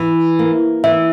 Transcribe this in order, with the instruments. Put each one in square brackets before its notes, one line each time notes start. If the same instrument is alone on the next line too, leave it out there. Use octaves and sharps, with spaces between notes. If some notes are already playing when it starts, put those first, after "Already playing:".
Already playing: [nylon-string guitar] E3
A#3
[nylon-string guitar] E3 [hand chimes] E5